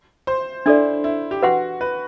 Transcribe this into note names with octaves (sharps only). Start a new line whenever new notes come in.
C5
D4 E4 A4 D5
E4
G4
F#4 B4 F#5 C6
B4